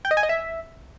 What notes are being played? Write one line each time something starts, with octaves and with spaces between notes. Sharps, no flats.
G5
D#5
G#5
D#5
E5